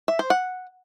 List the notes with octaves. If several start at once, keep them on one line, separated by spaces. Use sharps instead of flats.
E5
C5
F#5